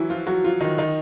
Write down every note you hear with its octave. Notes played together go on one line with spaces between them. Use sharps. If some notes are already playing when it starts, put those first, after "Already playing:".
Already playing: E3 F#3 E4 F#4
F3 F4
F#3 F#4
F3 F4
D#3 D#4
D#3 D#4